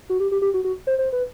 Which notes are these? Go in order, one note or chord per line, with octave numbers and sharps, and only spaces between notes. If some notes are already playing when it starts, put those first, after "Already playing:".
F#4
G4
G4
G4
F#4
F#4
C5
C5
B4